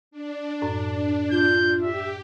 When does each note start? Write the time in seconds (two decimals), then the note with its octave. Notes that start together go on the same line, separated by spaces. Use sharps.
0.11 D4
0.62 F#2 A2
1.31 F4 G6
1.83 G4 E5